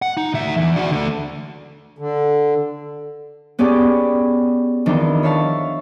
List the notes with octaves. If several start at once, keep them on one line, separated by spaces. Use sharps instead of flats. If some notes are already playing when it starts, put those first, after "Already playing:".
F#5
D#4
D2 E5
E2
D4 F#4
D3 A3
D3
B3 C#4 G4 G#4 D5
F2 D#3 E3 D4
C#5 E5 F5 A5